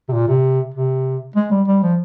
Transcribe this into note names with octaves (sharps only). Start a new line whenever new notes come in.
C3
A#2
C3
C3
G#3
G3
G3
F3